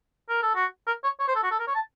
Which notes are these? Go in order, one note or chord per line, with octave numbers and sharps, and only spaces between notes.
A#4
A4
F#4
A#4
C#5
C#5
C5
A4
F#4
A4
A#4
C#5
A5